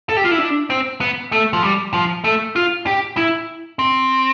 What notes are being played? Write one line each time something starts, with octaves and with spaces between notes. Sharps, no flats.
A4
G4
F4
E4
D4
C4
B3
A3
F3
G3
F3
A3
F4
G4
E4
C4